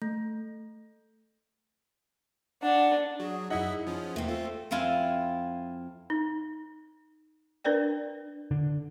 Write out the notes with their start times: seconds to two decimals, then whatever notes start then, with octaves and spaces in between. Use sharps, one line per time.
0.02 A3
2.63 D4 F#5
3.20 F#3 G#4
3.50 F#2 D#4 E4 E5 F#5
3.87 F3 C#4
4.16 E2 A3 A#3 C4
4.28 F4 A4
4.71 F2 C4 E4 F4 G#5
6.10 D#4
7.64 D4 A#4 B4 D5 G5
8.51 D3